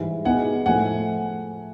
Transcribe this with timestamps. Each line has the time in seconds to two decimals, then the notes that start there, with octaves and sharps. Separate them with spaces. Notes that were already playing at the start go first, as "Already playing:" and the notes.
Already playing: G#2 E3 G3
0.25 E2 B2 G#3 B3 D#4 F#5 G#5
0.66 A2 F3 A3 F#5 G#5